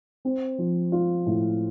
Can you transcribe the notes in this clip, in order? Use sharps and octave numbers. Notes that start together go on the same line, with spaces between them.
C4
F3
F4
A2